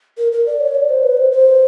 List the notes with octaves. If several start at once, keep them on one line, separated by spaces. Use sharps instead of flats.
A#4
A#4
D5
C#5
D5
C5
B4
C5
C5